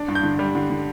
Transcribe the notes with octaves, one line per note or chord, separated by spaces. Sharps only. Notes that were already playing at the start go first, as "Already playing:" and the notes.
Already playing: D4
G2
G6
D3
G3
D3
D3